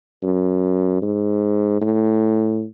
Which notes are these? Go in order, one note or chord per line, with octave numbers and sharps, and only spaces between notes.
F#2
G#2
A2